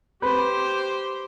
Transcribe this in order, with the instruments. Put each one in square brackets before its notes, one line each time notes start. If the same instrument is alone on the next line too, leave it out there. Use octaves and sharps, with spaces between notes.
[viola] G4 C5 [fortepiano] B4